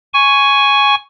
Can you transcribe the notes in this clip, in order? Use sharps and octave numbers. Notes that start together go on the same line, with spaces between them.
G#5 C#6